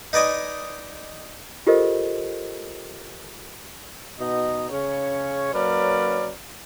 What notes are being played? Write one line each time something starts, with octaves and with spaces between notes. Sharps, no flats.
D#4 B4 D5 D#5 G#5
F4 G4 A4 A#4 C5 D#5
B2 D#4 D#5
C#3 C#4 C#5
F#3 A#3 C#4 A#4 B4 D5